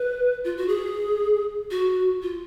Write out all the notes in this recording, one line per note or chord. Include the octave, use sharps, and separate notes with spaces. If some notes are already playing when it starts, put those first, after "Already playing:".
Already playing: B4
F4
F#4
G#4
F#4
F4